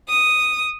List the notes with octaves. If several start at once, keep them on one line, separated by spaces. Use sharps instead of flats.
D#6